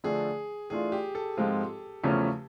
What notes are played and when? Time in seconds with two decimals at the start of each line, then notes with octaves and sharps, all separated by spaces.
0.04 D3 F3 A3 D4 G#4
0.70 E3 A3 D4 F4 G#4
0.92 G4
1.15 A4
1.37 G#2 F3 G#3 C4 F4
2.03 E2 C#3 F3 A3 C#4